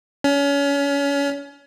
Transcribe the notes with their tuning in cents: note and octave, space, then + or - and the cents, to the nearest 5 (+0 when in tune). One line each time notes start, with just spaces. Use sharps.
C#4 +30